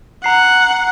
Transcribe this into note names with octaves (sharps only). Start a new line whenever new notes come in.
F#5 A#5 C7